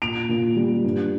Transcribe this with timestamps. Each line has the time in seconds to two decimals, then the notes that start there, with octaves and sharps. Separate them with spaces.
0.02 A#2 D7 F7
0.29 A#2
0.57 G3
0.84 G2